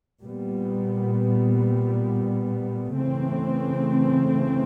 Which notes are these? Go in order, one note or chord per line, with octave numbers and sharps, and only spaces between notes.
A#2 G3 B3
C#3 E3 A3 C4